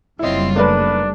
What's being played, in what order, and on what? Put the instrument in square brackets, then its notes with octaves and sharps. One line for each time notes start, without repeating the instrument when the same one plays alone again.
[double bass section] F#1 G3 [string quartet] C4 F4 C#5 [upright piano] E4 D#5
[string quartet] A3 [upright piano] A#3 A#4 B4 [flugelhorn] D4